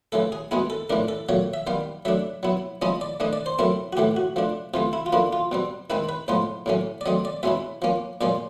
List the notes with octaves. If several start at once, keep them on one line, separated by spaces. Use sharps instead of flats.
C#3 E3 A3 A4
G#4
B2 G#3 B3 E4 G#4
A4
A2 E3 A3 D4 A#4
A4
A#2 F#3 A3 C#5
E5
D#3 G3 B3 F5
F#3 A3 D4 E5
F#3 B3 E4
F3 G#3 C#4 E4 D#5
D5
E3 A3 D4 D#5
D5
C5
F#3 A3 C4 E4 A#4
F#4
A2 E3 A3 G4
F#4
F3 A3 D4
C3 E3 A3 F4
E4
F4
D3 F3 A#3 E4
F4
B2 G3 C4
D#3 G#3 C4 E4 B4
B4
A2 F3 G#3 B3 C5
A2 F#3 A3 C#4
D5
F#3 A3 C4 D#5
D5
B2 G#3 C#4 E4 E5
F3 A#3 C#4
A#2 F3 G#3 C#4 D5